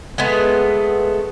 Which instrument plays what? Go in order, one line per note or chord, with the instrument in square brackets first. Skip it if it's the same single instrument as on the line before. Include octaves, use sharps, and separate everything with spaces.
[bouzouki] G#3 A3 B3